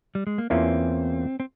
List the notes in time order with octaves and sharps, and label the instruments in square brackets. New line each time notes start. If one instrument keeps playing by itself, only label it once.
[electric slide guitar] G3
G#3
A#3
[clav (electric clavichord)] E2 E3 A#3 C#4 F4 [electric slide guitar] C4
[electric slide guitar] C4